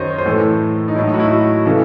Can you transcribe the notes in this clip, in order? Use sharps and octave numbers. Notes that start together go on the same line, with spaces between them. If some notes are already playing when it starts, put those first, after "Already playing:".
Already playing: F#2 D#3 F#3 C5 C#5 D#5
C5
A2 E3 A4
D#4
A2 F#3 E4
D#4
F#4
E4
F#4
C#3 E3 A4